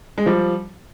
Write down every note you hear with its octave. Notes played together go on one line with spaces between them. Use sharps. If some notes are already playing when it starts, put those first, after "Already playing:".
G#3
F3 G3